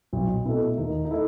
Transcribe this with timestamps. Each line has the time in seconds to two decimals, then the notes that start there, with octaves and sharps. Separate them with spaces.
0.13 B1
0.46 B2 A3 E4
0.78 D#2 D#4
1.05 D#4
1.11 A3 E4